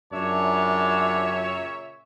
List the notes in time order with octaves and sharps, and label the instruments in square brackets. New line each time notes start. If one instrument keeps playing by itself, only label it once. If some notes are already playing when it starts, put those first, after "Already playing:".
[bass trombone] F#2 [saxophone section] A#2 C#3 E5 [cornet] D4 [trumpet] C#5